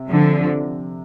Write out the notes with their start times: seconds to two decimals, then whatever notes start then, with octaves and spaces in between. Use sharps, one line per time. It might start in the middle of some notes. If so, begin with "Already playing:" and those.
Already playing: C3
0.09 D3 F3